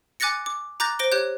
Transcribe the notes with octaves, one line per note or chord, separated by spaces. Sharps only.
G#5 D6 F#6 A6 A#6 C#7
D6
A#5 D6 F#6 G6 A6 A#6
C5 A#6 D7 G7
G4 C#5 F#6 G6